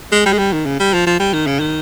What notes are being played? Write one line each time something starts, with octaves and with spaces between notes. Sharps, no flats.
G#3
G3
G#3
G3
D#3
C#3
G3
F3
F3
G3
D#3
C#3
D#3